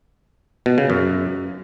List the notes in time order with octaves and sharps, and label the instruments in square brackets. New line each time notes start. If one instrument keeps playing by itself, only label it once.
[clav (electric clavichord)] B2
C#3
F#2